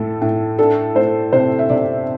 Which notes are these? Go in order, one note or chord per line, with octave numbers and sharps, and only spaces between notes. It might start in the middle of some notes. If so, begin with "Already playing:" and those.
Already playing: A2 A3 A4
A2
D4 A4
A3 C5
C3 C5
E5
C3 D5